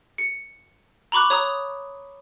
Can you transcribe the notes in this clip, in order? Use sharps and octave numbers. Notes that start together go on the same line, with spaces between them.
C#7
A#5 B5 C#6 D6 F#6
C#5 A#5 D#6